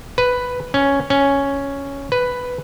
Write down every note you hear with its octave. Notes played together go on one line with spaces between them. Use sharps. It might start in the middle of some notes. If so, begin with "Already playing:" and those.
B4
C#4
C#4
B4